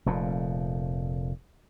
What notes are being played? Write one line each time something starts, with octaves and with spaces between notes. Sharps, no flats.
F1 F2 A#2